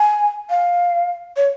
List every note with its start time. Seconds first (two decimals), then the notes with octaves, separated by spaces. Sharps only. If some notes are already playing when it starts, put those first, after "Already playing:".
Already playing: G#5
0.50 F5
1.37 C#5